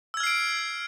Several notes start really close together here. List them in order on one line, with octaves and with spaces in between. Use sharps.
E6 G#6 F6 C7 D7